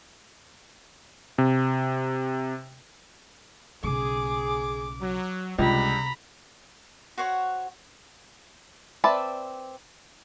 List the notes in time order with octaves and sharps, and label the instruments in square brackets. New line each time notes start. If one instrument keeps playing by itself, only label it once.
[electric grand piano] C3
[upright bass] B1 C#3 [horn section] G#4 [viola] D6
[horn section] F#3
[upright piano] C#2 [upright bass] C3 [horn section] G3 D4 [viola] A#5 B5
[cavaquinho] F#4 C5 C#5 F#5
[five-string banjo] C4 B4 D5 E5 A5